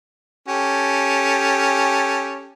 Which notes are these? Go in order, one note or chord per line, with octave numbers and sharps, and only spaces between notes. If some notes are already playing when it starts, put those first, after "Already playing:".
C#4 G4 A4